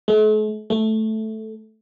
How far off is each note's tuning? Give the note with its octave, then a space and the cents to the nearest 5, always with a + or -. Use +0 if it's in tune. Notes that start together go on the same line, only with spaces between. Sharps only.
A3 -45
A3 -5